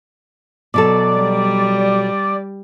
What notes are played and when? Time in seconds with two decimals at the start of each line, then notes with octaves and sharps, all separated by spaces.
0.74 B2 F#3 A4 D5
1.16 G3